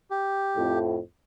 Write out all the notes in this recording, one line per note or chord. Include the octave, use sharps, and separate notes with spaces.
G4
F2 A2